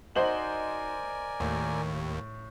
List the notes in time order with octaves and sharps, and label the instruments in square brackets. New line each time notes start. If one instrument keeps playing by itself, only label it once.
[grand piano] D#4 F#4 [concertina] A#4 D5 G#5 [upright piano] C5 D#5 F#7
[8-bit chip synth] D#2 [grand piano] A2